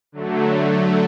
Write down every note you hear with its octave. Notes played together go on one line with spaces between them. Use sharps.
D3 F#3 A3